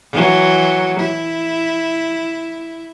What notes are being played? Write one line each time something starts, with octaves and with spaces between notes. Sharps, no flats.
E3 F#3
E4